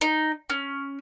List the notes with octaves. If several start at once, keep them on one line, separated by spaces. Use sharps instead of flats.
D#4
C#4